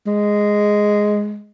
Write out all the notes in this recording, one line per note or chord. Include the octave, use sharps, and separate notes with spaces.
G#3